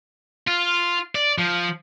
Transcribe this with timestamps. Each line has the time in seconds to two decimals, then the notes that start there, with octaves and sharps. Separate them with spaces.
0.48 F4
1.15 D5
1.38 F3